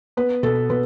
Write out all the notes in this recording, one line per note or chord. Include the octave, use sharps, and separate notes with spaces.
B3 B4
B2 A4
B2 B4